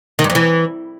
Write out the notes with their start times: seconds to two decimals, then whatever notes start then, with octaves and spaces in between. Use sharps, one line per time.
0.19 D#3
0.24 G2
0.30 F2
0.35 E3